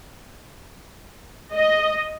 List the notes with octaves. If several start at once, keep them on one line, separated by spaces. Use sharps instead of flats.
D#5